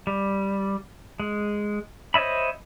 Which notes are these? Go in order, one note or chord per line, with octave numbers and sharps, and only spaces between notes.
G3
G#3
C5 C#5 D#5 E5 B5